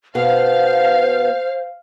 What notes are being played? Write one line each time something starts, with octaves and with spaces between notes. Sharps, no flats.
B2 B3 C5 F5